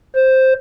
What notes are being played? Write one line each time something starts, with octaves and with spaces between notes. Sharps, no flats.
C5